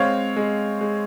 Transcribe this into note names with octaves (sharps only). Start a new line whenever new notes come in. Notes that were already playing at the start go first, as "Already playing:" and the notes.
Already playing: G#3 C4 C#5 F5
G#3
G#3